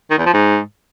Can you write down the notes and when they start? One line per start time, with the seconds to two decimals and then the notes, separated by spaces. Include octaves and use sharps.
0.10 D#3
0.18 E2
0.26 F3
0.34 G#2